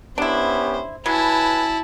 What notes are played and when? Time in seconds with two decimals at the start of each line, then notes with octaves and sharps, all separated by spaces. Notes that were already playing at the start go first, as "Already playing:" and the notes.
0.18 B3 C#4 D4 E4 G4 C5
1.06 F#3 E4 B4 G#5 A5 B5